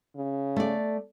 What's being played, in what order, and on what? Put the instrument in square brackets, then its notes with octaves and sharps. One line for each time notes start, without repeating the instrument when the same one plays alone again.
[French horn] C#3
[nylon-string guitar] A3 D5